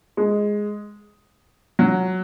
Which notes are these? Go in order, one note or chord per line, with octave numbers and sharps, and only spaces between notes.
G#3
F#3